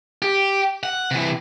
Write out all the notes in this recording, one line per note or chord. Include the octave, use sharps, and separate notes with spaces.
G4
F#5
C3 E3